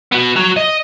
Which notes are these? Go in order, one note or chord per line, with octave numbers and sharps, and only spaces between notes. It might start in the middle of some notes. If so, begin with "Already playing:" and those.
B3 F#4
F#4 A#5
D#5